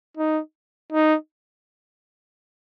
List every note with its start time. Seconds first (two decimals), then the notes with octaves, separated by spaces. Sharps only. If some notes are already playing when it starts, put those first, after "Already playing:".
0.17 D#4
0.92 D#4